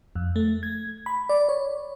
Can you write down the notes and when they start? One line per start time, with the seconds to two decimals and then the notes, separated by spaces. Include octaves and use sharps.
0.15 F2
0.36 A3
0.63 G#6
1.06 B5
1.29 D5
1.49 C#5